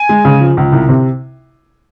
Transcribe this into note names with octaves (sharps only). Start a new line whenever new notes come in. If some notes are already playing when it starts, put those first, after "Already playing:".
Already playing: G#5
G#3
C#3
F3
C#2
C2
C3